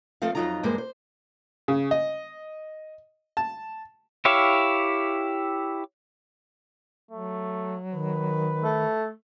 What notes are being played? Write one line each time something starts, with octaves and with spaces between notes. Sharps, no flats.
F3 A3 C4 A4 F5
F2 A#2 F#3 D#4 F4 A#5
E2 G2 G#3 A#3 C5
C5
C#3
D#5
A5
E4 G4 C#5 E5 F5
F#3 A3
D#3 B4
A3